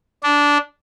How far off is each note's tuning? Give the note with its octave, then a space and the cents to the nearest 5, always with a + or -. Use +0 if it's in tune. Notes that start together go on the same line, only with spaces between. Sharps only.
D4 -15